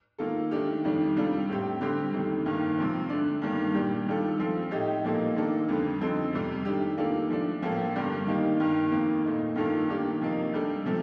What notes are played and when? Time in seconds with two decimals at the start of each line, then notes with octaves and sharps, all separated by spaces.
0.18 D#3 A#3 F4 A4
0.51 D#3 A3 D4 G4
0.84 F2 D#3 G3 D4
1.15 C3 G3 D4 F4 A4
1.48 A2 A3 C4 G4
1.81 D3 G3 C4 G4
2.13 F2 C3 D#3 A3
2.46 G2 D#3 A#3
2.78 C3 F3 C4
3.09 D3 A3 D4
3.42 G2 D#3 G3 A#3
3.74 A#2 G3 D4 G4
4.06 D#3 G3 D4 F4 A4
4.39 F3 A3 C4 F4
4.71 A2 A3 D#4 G4
5.04 A#2 F3 A#3 D#4 A4
5.36 D#3 A#3 D4 A4
5.68 F2 D3 G3
6.01 D3 F3 C4 D#4 A4
6.33 F2 C3 G3
6.65 D#3 A3 D4 G4
6.97 D#3 A#3 D4 F4 A4
7.30 F3 A3 D4
7.62 A2 F3 A#3 F4 A4
7.95 G2 D3 G3 A#3 D4
8.27 D#3 A#3 D#4 G4
8.60 G2 D#3 A#3
8.91 F2 D#3 A#3
9.24 A#2 A3 D#4
9.56 G2 D#3 A#3 F4 A4
9.89 D#3 A#3 D4 G4
10.21 C3 F3 A#3 D#4
10.53 C3 G3 D4 A4
10.85 C3 F3 A3